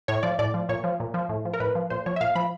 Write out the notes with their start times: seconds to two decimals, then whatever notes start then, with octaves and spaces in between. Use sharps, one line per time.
0.08 A2 C#5
0.23 F3 D5
0.39 A2 D5
0.54 F3
0.69 A#2 C#5
0.84 F3
1.00 A#2
1.14 F3
1.29 A2
1.45 F3
1.54 A#4
1.60 A2 B4
1.75 F3
1.90 A#2 C5
2.06 F3 C#5
2.16 E5
2.21 A#2 F5
2.35 F3 B5